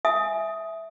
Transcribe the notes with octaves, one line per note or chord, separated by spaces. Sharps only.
E5 G#5 D#6